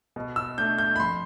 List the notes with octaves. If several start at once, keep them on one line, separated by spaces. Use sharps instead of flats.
B2
E6
A3 D4 G6
G6
B5
F2 C6